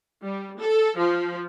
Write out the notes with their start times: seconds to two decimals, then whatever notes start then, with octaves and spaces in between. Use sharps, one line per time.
0.23 G3
0.60 A4
0.97 F3